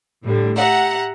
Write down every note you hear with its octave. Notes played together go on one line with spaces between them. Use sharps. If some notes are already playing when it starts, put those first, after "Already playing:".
A2 D3 G3
G4 E5 F#5 A#5